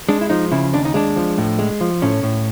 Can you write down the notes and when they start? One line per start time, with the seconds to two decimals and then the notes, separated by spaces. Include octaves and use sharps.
0.09 G#3 D4
0.21 E4
0.30 F3 D#4
0.52 C#3 E4
0.73 D#2 D4
0.85 D#4
0.94 G#3 D4
1.16 F3
1.38 A2
1.59 G#3
1.81 F3
2.02 A2 C#4
2.23 A2